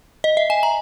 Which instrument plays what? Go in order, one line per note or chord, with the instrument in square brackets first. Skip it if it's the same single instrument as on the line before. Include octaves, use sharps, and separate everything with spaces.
[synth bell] D#5
E5
G#5
A#5